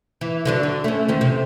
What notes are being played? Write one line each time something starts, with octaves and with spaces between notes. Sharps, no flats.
E3
D3 F#3 D4
D3
A3 C#4
E2 D#3 F3
C3